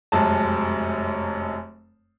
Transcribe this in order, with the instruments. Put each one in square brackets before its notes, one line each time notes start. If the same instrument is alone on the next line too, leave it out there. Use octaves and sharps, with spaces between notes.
[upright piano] F1 F#2 G#3 A5